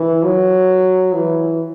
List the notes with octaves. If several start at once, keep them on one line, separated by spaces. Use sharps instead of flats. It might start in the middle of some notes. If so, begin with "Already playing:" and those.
Already playing: E3
F#3
E3